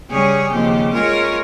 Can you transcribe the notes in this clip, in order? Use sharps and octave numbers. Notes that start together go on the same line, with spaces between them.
C#3 G3 C#4 G#4 C#5
D#2 C#3 F3 C4 G4
G#3 C#4 F4 A#4 C#5